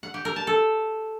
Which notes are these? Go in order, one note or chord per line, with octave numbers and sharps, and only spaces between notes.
F#5
G4
A#4
A5
A4